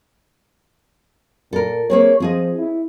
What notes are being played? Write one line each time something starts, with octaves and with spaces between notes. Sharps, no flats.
A#2 A4 A#4
A#3 C4 G#4 C#5
F3 C4 G#4 D#5
E4